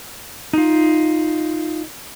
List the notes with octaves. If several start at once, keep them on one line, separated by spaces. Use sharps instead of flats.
D#4 F4